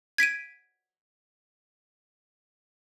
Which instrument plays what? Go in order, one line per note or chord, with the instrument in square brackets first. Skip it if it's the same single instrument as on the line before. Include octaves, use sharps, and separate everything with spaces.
[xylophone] G#6 B6 D7 D#7